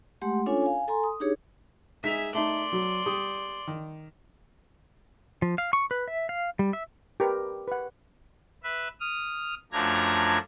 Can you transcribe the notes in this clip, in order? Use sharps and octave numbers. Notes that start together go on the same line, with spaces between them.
G#3 A3 G4 F#5 C6
C#4 D4 F4 A4 C#5 G#5
F5 G#5
A4 G#5 A#5 C6
D#6
D4 D#4 G4 G#4 C#5
G#3 D#4 G#4 E5 B6 F7
A3 D#4 D5 E5 C6
F#3
G3 D#6
D#3
F3
F5
C#6
B4
E5
F5
G3
E5
G4 A#4 B4
B4 F#5
B4 E5
D#6 F6
F#2 F3 A3 D4 A#5 G#6